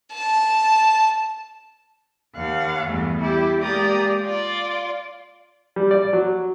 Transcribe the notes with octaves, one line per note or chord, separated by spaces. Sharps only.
A5
D#2 F5 F#5
E2 G2 A3 B3
G3 E4 G4
G#3 A#3 G4 D5 A#5 D#6
F4 D5
G3
D5
F#3